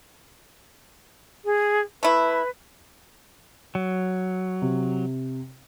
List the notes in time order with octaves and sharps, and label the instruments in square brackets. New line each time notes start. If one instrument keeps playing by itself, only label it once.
[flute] G#4
[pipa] A3 E4 [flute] B4
[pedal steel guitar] F#3
[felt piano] C3